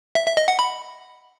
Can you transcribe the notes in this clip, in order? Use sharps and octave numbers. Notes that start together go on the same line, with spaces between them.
E5
E5
D#5
F#5
B5